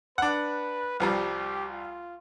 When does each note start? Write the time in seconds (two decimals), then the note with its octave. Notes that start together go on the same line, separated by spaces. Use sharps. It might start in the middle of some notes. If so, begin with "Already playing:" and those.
0.18 D4 B4 F#5
1.00 C2 F3 G3 G4
1.70 F4